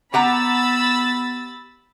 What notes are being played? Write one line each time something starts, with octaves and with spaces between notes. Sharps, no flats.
B3 G4 F#5 A#5 B5 E6 A6